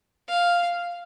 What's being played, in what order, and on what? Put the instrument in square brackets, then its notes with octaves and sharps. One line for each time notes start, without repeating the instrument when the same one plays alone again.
[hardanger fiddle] F5